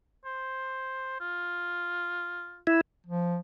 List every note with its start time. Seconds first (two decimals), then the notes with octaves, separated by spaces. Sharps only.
0.25 C5
1.20 F4
2.67 E4
3.07 F3